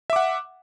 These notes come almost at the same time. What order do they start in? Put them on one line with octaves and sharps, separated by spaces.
E5 D6 F#5